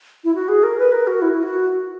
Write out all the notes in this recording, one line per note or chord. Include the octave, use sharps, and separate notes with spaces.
E4
F#4
G#4
A#4
B4
A#4
F#4
E4
E4
F#4